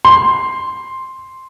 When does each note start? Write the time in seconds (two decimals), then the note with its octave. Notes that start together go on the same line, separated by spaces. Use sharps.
0.05 C6